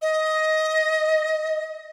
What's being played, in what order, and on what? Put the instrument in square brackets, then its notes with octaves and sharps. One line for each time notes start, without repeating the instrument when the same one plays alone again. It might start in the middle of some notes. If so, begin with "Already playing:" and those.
[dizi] D#5